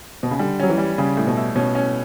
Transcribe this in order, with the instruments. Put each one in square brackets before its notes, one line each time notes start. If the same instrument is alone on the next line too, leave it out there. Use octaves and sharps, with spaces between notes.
[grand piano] B2
C#3
[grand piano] D3 [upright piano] G3
[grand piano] F#3 [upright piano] C#4
[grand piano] E3
[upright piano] G3
[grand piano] C#3 [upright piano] G3
[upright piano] A2
[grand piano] B2
[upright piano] E4
[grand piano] B2 [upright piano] C#4
[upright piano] C#4